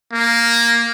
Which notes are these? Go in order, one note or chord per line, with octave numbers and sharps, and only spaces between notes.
A#3